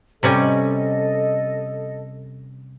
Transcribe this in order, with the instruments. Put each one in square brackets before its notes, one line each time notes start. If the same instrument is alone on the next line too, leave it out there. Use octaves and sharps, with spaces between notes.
[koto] C3 G3 C#4 [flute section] A4 D#5